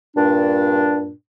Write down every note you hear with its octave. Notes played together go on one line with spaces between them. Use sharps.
G2 A#2 D4